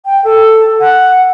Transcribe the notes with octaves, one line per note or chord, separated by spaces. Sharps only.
G5
A4
F#5